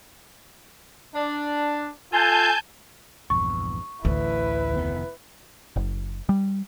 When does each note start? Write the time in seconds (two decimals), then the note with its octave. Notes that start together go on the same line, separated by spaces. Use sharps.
1.14 D4
2.12 F4 A4 G#5 A5 G6
3.30 A#1 E2 G2 C#6
4.05 A1 D2 E4 B4
4.72 F1 D#3 B3
5.76 F#1
6.29 G3